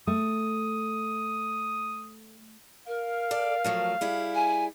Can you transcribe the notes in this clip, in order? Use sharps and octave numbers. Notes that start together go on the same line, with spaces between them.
A3 D#6
A#4 F5
A4 D5
F3 F#3 A3
G3 E4 G#4
G#5